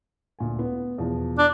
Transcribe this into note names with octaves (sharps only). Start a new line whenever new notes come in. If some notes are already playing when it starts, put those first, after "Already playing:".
D2 A#2 G#5
B3
E2 B2 F3
D4